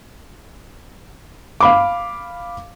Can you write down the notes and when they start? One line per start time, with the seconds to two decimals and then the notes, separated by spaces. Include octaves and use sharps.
1.61 F5 B5 D6